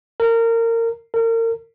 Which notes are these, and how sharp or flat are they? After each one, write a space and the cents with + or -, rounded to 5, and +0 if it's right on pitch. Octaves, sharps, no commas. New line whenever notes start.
A#4 -25
A#4 -35